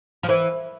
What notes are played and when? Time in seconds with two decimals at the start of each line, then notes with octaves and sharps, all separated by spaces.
0.23 F3
0.29 E3